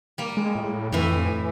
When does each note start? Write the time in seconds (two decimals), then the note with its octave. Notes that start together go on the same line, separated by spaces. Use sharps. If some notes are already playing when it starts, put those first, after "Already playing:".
0.18 G3 A#3
0.37 G#3
0.55 A2
0.92 F2 A2 E3